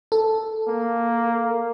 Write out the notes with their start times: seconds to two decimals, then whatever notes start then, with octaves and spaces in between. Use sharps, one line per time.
0.12 A4
0.68 A#3